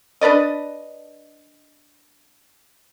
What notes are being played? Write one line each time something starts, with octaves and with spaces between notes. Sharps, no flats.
D4 B4 D5 D#5